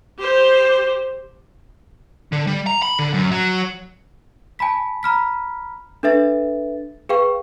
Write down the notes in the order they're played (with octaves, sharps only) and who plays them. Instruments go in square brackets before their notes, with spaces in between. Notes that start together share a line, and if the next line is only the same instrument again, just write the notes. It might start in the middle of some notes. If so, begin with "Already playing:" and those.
[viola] G4 C5
[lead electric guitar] D3
G3
A#5
B5
D3
F#2
F#3
[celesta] G#5 A5 B5 B6
A#5 B5 F6 B6
D4 A4 B4 E5 A6
G#4 B4 F5 G5 C#6